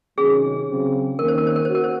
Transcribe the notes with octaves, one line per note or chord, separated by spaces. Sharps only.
C3 D#3 F#3 C#4 G#4
C#3 F#3 C4
D#3 A#3 C#4 A#4
C5
A#4
C5
A#4
C5
F#4
A#4
C5